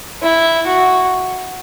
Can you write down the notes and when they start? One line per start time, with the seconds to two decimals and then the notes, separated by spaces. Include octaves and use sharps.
0.22 E4
0.67 F#4